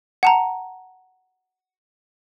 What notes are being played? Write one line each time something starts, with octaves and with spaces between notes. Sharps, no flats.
F#5 A5 A#5